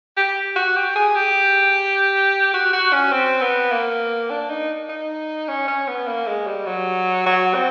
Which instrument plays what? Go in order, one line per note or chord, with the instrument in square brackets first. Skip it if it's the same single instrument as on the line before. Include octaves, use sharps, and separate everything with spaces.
[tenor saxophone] G4
F#4
G4
G#4
G4
F#4
F#4
C#4
C4
B3
A#3
D4
D#4
D#4
C#4
C#4
B3
A#3
G#3
G3
F#3
F#3
C4